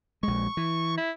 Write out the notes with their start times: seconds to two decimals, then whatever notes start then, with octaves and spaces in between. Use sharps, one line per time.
0.23 A#1 G#3 C#6
0.57 E3
0.97 E4